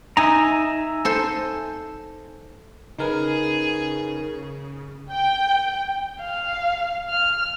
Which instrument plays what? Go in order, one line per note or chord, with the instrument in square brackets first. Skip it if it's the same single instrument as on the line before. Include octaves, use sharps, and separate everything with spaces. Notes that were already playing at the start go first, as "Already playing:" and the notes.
[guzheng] D#4 [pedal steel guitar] E5 G#5 A#5
[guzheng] A4 C5 C6
[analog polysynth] C#3 [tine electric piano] D#4 A#4 B4 [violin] G#4
[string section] G5
[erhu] F5
F6